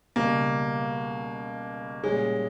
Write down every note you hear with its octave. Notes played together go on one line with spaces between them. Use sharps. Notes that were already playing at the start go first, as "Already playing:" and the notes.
C#2 B2 G3 A#3
A#2 G3 G#3 C#4 G#4